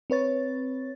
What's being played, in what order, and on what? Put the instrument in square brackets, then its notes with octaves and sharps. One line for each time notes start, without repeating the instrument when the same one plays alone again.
[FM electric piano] C4 B4 C#5 A6